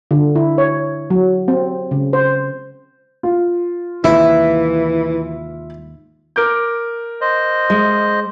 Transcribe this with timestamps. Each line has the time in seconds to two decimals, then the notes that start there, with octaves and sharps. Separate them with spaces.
0.11 D3
0.36 E4
0.58 C#5
1.10 F#3
1.48 C4
1.91 C#3
2.13 C5
3.23 F4
4.04 D#2 G#2 C3 E3 E4
6.36 A#4 D6 G6
7.21 C5 D#5
7.70 G#3